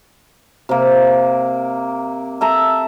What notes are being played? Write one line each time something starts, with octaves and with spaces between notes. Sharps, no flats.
C3 A#3
A4 E5 A#5